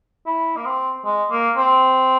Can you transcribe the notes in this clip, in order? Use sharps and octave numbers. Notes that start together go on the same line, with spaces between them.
E4
A#3
C4
G#3
A#3
C4